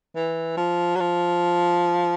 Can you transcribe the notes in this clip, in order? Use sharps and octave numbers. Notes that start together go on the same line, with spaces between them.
E3
F3
F#3
F3